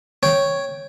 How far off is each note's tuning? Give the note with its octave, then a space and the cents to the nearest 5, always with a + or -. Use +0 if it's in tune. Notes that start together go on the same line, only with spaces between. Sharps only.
C#5 +0 G5 +0